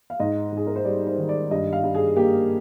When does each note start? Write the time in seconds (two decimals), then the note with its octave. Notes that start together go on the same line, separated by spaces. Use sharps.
0.10 F5
0.20 G#2 D#5
0.52 G#2 G#4
0.67 A#4
0.76 C5
0.85 G3 D5
1.07 C5
1.18 D#3
1.29 D5
1.51 G2 D#5
1.73 F5
1.83 G2
1.94 G#4
2.16 A#3 G4